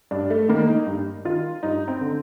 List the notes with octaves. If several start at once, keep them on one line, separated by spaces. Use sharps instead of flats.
G2 D4
A3
D#3 A#3
D#4
G2
D#3 F4
G2 D#4
C4
D3